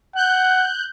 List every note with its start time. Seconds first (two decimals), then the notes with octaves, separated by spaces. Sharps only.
0.15 F#5 F#6 G6